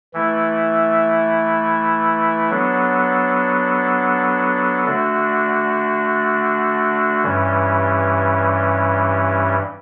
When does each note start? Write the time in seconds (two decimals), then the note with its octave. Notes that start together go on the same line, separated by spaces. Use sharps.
0.14 E3 A3 E4
2.50 F#3 B3 D4 A4
4.87 D3 A3 D4 F#4
7.23 G2 E3 G3 C#4